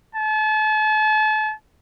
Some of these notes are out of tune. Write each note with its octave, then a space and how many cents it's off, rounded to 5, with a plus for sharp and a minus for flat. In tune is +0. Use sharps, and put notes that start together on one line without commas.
A5 -40